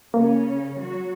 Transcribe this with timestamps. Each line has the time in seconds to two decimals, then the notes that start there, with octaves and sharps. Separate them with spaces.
0.14 C#3 A#3 C#4
0.79 F#3 F#4